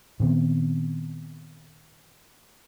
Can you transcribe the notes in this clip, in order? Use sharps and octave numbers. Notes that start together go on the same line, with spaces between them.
A#2 D#3 B3 C4